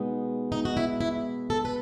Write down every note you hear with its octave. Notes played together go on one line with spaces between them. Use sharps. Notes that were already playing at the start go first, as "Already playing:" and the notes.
Already playing: B2 G#3 B3 D#4
D#4
F#4
E4
E4
A4
B4